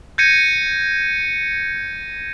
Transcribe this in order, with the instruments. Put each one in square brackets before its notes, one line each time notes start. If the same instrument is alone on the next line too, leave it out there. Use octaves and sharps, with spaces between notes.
[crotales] G6 G#6 A#6 C#7 D#7